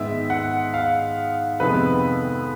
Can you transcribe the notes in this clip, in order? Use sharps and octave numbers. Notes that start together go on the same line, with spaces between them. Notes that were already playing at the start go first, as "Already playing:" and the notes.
Already playing: G#2 D#3 G#3 B3 E5
F#5
F5
F2 C3 D#3 G#3 B3 B4